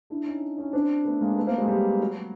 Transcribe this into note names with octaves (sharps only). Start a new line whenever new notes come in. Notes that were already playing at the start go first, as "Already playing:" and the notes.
D4 E4
C#4 D#4
C#4 D#4
C4 D4
A3 B3
G#3 A#3
A3 B3
A#3 C4
F#3 G#3
G3
F#3